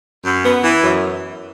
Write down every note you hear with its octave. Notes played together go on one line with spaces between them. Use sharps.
F#2
B3
E3
F#2